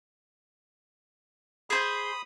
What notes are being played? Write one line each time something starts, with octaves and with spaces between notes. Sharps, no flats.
G#4 C5 B5 D#6